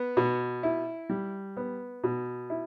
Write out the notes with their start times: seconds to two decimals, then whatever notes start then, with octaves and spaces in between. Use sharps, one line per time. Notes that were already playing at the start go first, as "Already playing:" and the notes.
Already playing: B3
0.17 B2
0.63 E4
1.10 G3
1.57 B3
2.04 B2
2.50 E4